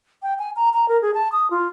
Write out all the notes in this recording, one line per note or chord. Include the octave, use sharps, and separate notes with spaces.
G5
G#5
A#5
A#5
A#4
G#4
A5
D#6
F4